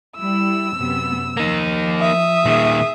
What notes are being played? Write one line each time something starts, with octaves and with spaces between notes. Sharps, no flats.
G3 E4 E6
F#2 C3 B3
F3 A#3 D#4
E5 D#6
A#2 D#3 G#4